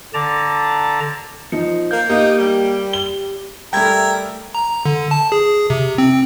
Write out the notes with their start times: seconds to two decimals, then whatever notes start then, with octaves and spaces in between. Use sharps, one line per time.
0.14 D3 D5 A5 A#5
1.52 F3 D#4 C#7
1.91 A#3 G6
2.10 A#3 D#4 G4
2.39 G3
2.93 G7
3.73 G3 A3 A#4 E5 G5 G#6
4.55 A#5
4.85 D3
5.11 A5
5.32 G#4
5.70 C3
5.98 C4